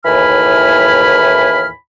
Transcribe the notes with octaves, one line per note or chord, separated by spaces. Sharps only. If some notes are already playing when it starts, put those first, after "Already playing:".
D#2 A2 E3 G#5 B5 F6